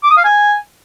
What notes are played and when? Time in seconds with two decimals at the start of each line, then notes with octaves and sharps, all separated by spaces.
0.03 D6
0.10 D#6
0.17 F5
0.24 G#5